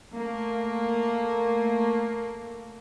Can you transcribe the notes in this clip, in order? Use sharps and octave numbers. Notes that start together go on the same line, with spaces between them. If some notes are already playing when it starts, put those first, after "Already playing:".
A3 A#3